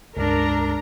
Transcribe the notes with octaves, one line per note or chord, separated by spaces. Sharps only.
C#2 G2 G#3 D4 A#4 A#5